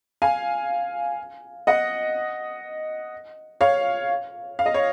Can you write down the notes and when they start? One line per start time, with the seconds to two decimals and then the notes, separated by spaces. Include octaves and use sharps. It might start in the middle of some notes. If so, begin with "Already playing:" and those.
0.22 F5 G#5
1.67 D#5 F#5
3.61 C#5 F5
4.59 F5
4.66 D#5
4.74 C#5